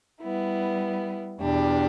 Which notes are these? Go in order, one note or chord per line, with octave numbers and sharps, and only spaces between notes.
G3 B3 E4
E2 B2 B3 D4 G4